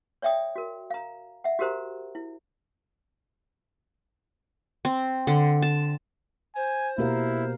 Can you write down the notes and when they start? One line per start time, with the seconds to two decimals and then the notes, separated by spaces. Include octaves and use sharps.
0.22 C#5 D5 E5 G5 D#6
0.56 F#4 A#4
0.90 F5 A#5
1.44 E5 F#5
1.59 F#4 G4 A#4 C5 A#5
2.15 E4
4.85 C4
5.27 D3
5.62 A5
6.56 C5 G#5
6.98 B2 A#3 E4 G4 A#4 F5